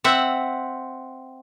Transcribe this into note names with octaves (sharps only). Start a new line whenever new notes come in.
C4 E5 F#5